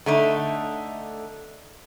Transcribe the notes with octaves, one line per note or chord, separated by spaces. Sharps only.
D3 A3 D#4